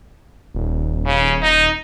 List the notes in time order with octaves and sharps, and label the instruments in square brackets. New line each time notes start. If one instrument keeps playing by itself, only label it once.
[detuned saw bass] D#1
[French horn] C#3
D#4